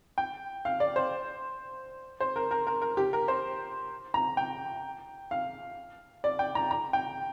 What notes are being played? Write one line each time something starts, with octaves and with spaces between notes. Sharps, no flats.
G5
F5
D5
C5
C5
A#4
A#4
A#4
A#4
G4
A#4
C5
A#5
G5
F5
D5
G5
A#5
A#5
G5